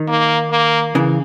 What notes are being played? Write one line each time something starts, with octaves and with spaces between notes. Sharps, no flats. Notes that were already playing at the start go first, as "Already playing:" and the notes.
Already playing: D#3
A#3
A#3
C#3 E3